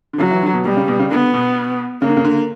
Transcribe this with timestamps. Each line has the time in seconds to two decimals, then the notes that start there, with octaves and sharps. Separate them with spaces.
0.13 D3
0.19 C#3 F#3
0.31 E3
0.42 D3
0.54 B2
0.65 B2 G3
0.77 C#3
0.88 B2
1.00 C#3
1.11 D3 B3
1.34 B2
2.02 C#3 A#3
2.09 D3
2.17 C#3
2.25 D3